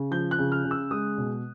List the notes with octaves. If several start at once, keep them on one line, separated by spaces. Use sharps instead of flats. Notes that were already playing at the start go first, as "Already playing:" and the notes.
Already playing: C#3
F3 G6
F#6
C#3
F6
C#3
E6
G#3 D#6
B2